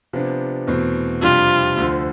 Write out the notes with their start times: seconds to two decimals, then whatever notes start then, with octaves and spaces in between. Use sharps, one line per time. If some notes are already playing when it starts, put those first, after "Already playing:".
0.13 C3 F3 B3 D4
0.67 E2 B2 A3 C4
1.22 F2 C3 G3 D4 F4
1.77 D2 D3 F3